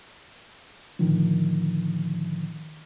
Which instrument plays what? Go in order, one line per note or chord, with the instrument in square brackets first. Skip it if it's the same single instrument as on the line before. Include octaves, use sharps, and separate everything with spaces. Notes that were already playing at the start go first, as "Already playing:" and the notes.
[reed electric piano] A2 D3 D#3 F3